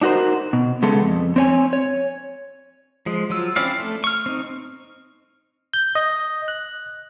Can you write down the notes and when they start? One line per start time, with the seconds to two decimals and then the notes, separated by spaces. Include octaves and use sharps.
0.02 D4 D#4 F#4 A#4 C5
0.53 B2
0.82 C#3 G#3 B3 A4
1.02 F2
1.36 C4 C#5 G#5
1.73 C#5
3.06 F3 G#3
3.30 F3 F#3 F4 E6
3.56 C4 C#4 E4 D5 F5
3.79 A3
4.04 C#6 F6
4.26 C4 D#4
5.73 G6
5.95 D#5
6.48 F#6